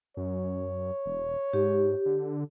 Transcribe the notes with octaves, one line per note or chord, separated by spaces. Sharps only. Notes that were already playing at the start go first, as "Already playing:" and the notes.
F#2 C#5
E1
G#2 G4
D3